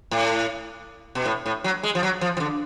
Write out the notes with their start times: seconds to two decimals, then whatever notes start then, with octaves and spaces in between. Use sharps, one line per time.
0.11 A2
1.15 B2
1.26 A2
1.46 A2
1.64 F#3
1.83 G#3
1.95 F3
2.03 F#3
2.21 F3
2.37 F3
2.40 D3